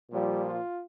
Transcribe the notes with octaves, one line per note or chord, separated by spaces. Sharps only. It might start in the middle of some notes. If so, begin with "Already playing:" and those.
A#2 F3 G3
F4